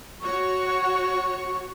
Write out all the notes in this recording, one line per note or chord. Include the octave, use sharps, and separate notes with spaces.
F#4 C#5 C#6